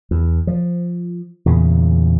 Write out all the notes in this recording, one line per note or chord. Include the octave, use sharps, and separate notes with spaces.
E2
F3
E2 A#2 C#3